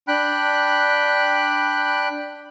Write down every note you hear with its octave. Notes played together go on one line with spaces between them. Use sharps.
D4 G5 B5 F#6